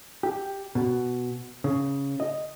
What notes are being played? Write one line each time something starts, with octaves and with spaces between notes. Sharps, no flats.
G4
B2
C#3
D#5